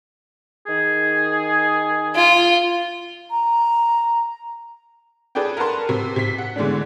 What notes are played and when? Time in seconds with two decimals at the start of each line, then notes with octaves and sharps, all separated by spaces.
0.67 D#3 G#4
2.15 F4
3.31 A#5
5.35 G#4 A4 B4 D5 G5
5.57 A#4 B4 F#5 A5 C6
5.89 C3
6.16 C3 B6
6.38 F#5
6.56 D3 E3 G#3 A3 B3 D4